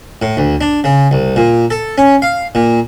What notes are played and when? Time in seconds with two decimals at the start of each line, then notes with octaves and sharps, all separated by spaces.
0.22 A2
0.37 D2
0.61 D4
0.84 C#3
1.11 C2
1.36 A#2
1.71 A4
1.98 C#4
2.22 F5
2.55 A#2